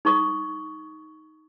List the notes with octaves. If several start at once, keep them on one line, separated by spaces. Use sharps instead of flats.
D#4 C#6 D#6